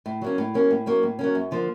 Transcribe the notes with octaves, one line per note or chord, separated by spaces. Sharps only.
A2
F#3 A#3 C#4
A2
F#3 A#3 C#4
A2
F#3 A#3 C#4
A2
F#3 A#3 C#4
F#2
D3 F3 A#3